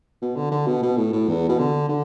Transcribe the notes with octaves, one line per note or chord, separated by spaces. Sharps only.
B2
D3
D3
B2
B2
A2
A2
E2
B2
D3
D3